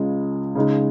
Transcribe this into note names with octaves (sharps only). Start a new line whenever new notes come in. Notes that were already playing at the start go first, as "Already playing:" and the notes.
Already playing: C#2 C#3 G#3
C#3 G#3 D#4